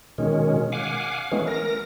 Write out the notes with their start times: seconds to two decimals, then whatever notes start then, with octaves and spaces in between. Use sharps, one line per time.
0.18 B2 D#3 G#3 C#4
0.72 F5 F#5 G#5 D6
1.32 E3 G#3 A3 B3 C#4
1.47 A#4 A#6